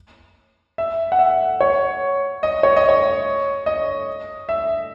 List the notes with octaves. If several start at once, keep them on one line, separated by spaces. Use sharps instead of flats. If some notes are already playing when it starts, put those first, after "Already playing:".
E5
F#5
E5
C#5
D#5
C#5
D#5
C#5
D#5
E5